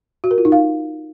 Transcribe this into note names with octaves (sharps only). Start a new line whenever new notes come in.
F#4
A#4
F4
D#4
F5